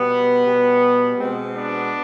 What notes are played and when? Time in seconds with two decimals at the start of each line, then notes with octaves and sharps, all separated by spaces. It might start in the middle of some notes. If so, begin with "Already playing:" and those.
Already playing: B2 G3 B3
0.46 B2 G3
1.18 B2 G#3 C4
1.54 B3 D4